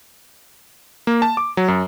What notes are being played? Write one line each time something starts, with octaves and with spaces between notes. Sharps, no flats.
A#3
A5
D6
F#3
F#2